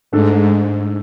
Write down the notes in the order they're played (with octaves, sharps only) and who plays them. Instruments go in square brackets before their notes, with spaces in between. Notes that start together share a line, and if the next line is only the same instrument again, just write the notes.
[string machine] G#2 [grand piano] A3 D4 A4